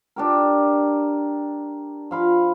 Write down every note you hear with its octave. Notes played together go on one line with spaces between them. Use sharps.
D4 G4 A#4
F3 F5 B5